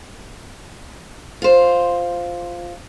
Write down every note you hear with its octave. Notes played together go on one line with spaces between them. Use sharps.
F4 C5